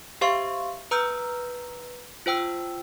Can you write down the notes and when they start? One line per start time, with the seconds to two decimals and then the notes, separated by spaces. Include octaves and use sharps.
0.21 G4 C5 E5 F5 C6 C#6
0.91 B4 A#5 E6 F6 G6
2.26 F4 C5 G5 E6